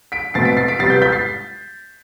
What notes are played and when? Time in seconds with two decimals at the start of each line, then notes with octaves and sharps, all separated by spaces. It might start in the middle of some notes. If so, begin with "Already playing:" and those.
0.12 B6 D7
0.34 B2 A3 C4 A6 C7
0.45 B6 D7
0.57 A6 C7
0.68 B6 D7
0.79 C3 G3 B3 A6 C7
0.90 G6 B6
1.02 G6 B6
1.12 A6 C7